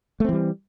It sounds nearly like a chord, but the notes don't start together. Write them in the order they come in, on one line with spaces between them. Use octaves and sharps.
A3 C4 E3 G3